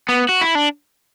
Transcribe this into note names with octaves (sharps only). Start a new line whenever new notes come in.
B3
F#4
E4
D4